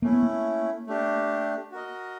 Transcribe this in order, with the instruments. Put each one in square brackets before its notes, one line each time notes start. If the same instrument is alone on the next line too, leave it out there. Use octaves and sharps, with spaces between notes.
[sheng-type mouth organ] A3 C#4 E4 [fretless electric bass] A#3
[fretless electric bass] B3
A#3
[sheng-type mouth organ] A3 D4 G4
F#4 A#4 D#5